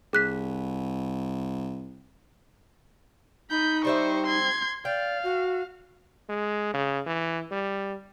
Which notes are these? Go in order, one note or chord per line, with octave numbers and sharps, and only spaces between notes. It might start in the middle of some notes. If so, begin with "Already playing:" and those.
C2 G#4 F#6 B6
D#4 B5 G6
G3 C4 C5 E5 C#6
C6 G#6
D5 F5 G5
F#4
G#3
C#3
E3
G3